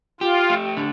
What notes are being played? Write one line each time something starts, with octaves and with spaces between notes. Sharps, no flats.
F4 G4
A3
D3